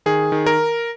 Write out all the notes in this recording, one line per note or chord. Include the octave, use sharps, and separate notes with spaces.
D#3 G#4
D#3
A#4